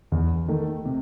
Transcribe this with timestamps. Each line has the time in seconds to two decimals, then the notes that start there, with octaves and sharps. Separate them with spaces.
0.12 E2
0.48 D#3 A3
0.85 C3